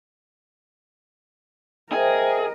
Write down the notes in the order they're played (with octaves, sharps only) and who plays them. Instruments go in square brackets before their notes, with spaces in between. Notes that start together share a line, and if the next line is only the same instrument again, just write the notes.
[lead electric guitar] G#4 [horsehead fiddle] A#4 D#5 [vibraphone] C5 E5 G5